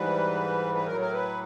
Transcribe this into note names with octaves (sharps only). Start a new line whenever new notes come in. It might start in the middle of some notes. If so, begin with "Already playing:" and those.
Already playing: G#2 E3 G3 B4
B4
A2 F#3 A#4
A#4
B4